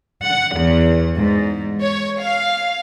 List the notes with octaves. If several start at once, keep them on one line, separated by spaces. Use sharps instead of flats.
F#5
E2
G#2
C#5
F5